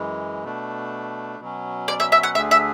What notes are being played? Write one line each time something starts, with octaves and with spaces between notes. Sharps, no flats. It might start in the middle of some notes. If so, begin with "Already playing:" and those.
Already playing: F#2 E3 G#3
B2 A3 D4
B2 F#3 C#4
D5
E5
E5
F#5
D2 D3 A3 D4 G#4 E5
E5